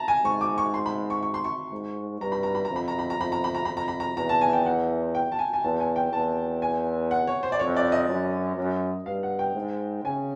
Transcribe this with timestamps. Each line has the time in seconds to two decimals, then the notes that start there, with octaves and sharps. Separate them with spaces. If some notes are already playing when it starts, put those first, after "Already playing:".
Already playing: A5 A#5
0.08 G#5
0.24 G#2 C#6
0.41 D6
0.58 C#6
0.74 C6
0.86 B5
1.10 C#6
1.23 C#6
1.34 C6
1.44 C#6
1.72 G#2
2.21 G2 A#5
2.32 B5
2.43 A#5
2.55 B5
2.65 A#5
2.70 F2
2.76 B5
2.88 A#5
2.99 B5
3.10 A#5
3.18 F2 B5
3.32 A#5
3.44 B5
3.55 A#5
3.65 F2 B5
3.77 A#5
3.88 B5
4.00 A#5
4.17 E2 A#5
4.29 A5
4.41 G#5
4.53 G5
4.66 F#5
5.15 G5
5.32 A5
5.39 G#5
5.53 G#5
5.64 E2 A5
5.80 G#5
5.96 G5
6.12 E2 A5
6.62 G#5
7.11 F#5
7.27 C#5
7.43 C5
7.52 D5
7.60 F2 C#5
7.76 D5
7.92 D#5
8.09 F#2
8.57 F#2
9.06 G2 F5
9.23 F#5
9.39 G5
9.55 G#2
10.04 C#3 G#5